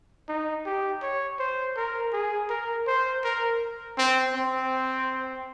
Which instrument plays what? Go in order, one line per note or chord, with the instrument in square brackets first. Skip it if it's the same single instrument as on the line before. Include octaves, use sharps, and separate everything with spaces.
[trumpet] D#4
G4
C#5
C5
A#4
G#4
A#4
C5
A#4
C4
C4